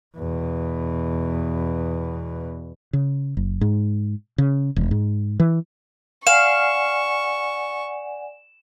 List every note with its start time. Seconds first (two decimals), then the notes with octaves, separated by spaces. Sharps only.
0.16 E2 B2
2.93 C#3
3.37 F#1
3.61 G#2
4.38 C#3
4.76 E1
4.91 G#2
5.40 E3
6.27 D5 F5 F#5 G#5 C#6 E7